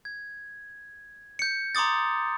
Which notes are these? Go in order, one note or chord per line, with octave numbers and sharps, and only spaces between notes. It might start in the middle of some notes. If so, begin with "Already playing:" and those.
G#6
G6 C#7
A#5 C6 D6 D#6 A6